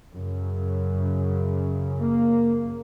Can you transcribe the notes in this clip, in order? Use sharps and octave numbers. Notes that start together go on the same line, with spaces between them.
F#2 C#3
A#3